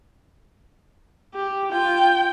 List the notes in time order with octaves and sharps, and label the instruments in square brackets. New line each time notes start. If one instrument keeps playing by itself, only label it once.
[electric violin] G4
[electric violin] F4 [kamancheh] G5